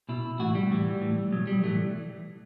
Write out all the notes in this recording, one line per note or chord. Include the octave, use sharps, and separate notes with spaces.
B2 E4
A2 E3 F#4
G3
A2 E3
A2 E3
B2 F#3
G3
A2 E3 A3